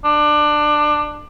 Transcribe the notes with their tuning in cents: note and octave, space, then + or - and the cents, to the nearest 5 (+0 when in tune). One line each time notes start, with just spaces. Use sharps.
D4 +20